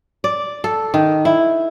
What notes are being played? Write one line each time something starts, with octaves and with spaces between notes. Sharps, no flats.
D5
A4
D#3
E4